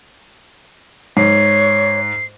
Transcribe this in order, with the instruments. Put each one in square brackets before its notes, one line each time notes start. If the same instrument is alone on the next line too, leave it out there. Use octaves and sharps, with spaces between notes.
[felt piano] G#2 [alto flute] C#5 [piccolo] C7